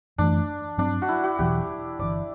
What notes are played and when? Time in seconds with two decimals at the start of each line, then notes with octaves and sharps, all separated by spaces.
0.18 F#2 E3 A3 D4
0.78 G2 F#3 C4 D4
1.02 F#4
1.09 E4
1.24 F#4
1.38 E1 E2 B2 F#3 G4
1.99 G1 G2 E3 D5